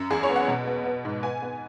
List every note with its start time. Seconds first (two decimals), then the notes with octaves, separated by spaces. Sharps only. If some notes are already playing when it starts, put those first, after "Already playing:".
Already playing: F#2
0.11 E2 G#4
0.23 C#5
0.29 B3
0.36 F#5
0.48 B2
0.67 B3
0.85 B3
1.05 G#2
1.23 B3 G#5
1.42 B3